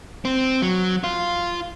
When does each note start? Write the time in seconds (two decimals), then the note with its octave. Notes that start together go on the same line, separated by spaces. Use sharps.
0.25 C4
0.62 F#3
1.04 F4